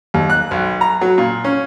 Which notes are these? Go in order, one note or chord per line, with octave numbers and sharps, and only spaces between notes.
D#2
F#6
B1
A#5
F#3
A#2
C#4